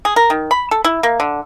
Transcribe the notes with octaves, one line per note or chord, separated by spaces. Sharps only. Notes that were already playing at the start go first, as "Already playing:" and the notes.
G#4
A#4
D#3
B5
A4
E4
A#3
D3